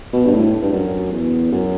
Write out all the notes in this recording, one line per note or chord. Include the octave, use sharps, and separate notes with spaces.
B2
G2
A2
G2
F#2
E2
F#2